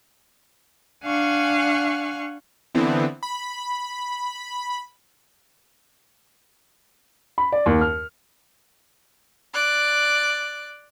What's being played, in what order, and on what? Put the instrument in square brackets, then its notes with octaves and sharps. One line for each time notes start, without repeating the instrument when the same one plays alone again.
[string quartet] D4 F5 F#5 G#5 C#6
[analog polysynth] D3 E3 B3 C4 E4
B5
[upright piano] B5
D5
D#2
F6
[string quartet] D5 F#6